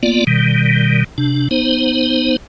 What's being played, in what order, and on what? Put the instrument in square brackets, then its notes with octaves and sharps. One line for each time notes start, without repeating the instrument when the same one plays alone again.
[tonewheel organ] A#3 B3 F4 D5
B2 D#3 G3
C3 D4
B3 D#4 C5